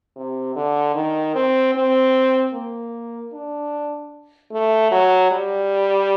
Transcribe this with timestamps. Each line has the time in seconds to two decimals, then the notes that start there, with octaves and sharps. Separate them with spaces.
0.16 C3
0.56 D3
0.95 D#3
1.35 C4
1.75 C4
2.54 A#3
3.33 D4
4.52 A3
4.91 F#3
5.31 G3